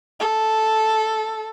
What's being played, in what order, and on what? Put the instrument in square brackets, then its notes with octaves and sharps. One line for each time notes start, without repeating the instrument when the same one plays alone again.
[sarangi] A4